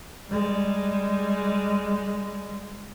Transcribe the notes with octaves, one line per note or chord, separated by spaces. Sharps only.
G3 G#3